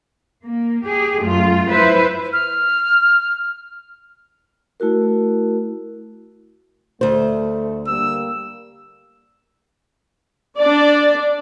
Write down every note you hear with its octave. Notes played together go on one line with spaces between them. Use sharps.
A#3
G4 G#4
F#2 A3 F4
E4 B4 C5 E5
F6
A3 E4 F#4 A#4
D2 A3 C5
G3 A#3 E6
D4 D5